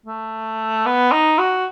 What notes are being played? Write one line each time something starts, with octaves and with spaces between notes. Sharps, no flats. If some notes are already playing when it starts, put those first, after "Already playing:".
A3
B3
D#4
F#4